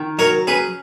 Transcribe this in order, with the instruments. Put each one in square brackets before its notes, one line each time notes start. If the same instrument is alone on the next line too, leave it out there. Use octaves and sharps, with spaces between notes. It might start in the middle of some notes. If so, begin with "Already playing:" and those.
Already playing: [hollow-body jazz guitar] D#3
[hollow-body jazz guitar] F#3 [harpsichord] A#4 C#5
[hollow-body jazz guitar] C#4 [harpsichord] G#4 B4